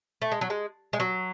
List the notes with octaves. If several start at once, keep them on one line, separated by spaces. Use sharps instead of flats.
A3
G#3
F#3
G#3
G#3
F#3